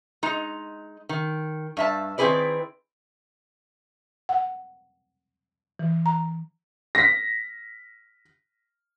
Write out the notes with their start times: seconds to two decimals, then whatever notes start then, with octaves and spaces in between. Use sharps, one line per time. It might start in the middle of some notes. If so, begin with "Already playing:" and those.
0.23 G#3 D#4 A#5
1.09 D#3
1.77 G2 E5 A5
2.18 D#3 C4 E4 G#4 B4 D5
4.29 F#5
5.79 E3
6.06 A#5
6.95 A#6 B6